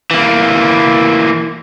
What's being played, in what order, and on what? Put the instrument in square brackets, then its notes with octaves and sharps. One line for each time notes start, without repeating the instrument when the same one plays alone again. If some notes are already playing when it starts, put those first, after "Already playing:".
[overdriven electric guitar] E3 A#3